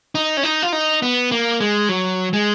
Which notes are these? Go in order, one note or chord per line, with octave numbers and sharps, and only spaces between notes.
D#4
C#4
D#4
F4
D#4
B3
A#3
G#3
F#3
G#3